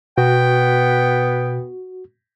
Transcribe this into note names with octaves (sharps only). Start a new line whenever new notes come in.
B2 B3 F#4 G5